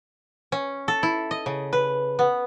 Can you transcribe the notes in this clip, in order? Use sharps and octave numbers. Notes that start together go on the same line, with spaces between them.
C#4
A4
E4
D#5
C#3
B4
B3